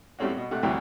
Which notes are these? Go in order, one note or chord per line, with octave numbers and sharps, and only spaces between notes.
A2 G3 A3 C4 C#4 F#4
B2
C3 A3 F#5 F#6
D2 G2 C3 E3 F#3 C4